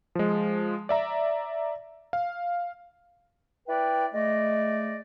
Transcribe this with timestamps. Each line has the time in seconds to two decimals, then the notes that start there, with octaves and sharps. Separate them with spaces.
0.15 F3 G#3
0.89 D5 E5 A#5
2.13 F5
3.69 E4 B4 D5 G5
4.13 G#3 A3 D5 D#5